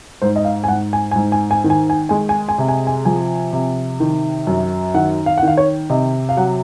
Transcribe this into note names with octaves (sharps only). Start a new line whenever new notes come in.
G#2 C5
D#5
F5
G#5
G#2 F#5
G#5
G#2 G#5
G#5
G#5
D#3
G#5
G#5
G#3 G#5
G#5
G#5
C3
G#5
G#5
F3 G#5
C3
D#3
F#2
D#3 F#5
F5
F#5
D#3 F5
C#5
C3 D#5
F5
F#3 F#5